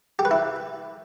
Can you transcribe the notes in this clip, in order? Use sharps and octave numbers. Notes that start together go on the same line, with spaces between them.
G4
B4
E4